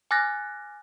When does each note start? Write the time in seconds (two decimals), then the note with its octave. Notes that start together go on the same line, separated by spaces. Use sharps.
0.11 G#5 D6 F6 F#6 A6 A#6